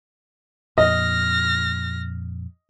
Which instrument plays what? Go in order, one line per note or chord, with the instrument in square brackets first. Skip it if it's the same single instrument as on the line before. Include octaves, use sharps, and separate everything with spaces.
[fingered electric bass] F2 A#2 [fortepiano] D#5 [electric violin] F6 A#6